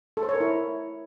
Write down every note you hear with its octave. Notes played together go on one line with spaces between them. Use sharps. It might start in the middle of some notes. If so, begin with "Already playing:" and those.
A4
C5
C#5
A#4
E4